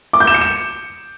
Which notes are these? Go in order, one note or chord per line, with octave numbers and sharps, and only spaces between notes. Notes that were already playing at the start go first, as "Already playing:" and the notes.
D6
G6
E7
C#7
E7